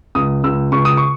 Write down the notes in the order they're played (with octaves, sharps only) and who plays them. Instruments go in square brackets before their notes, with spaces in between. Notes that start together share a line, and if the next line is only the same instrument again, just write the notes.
[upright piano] C#2 D#6
C#2 E6
C#2 C#6
D#6
C#6